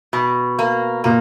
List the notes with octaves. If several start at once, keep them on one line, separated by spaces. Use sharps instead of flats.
B2
A#3
A#2 A#3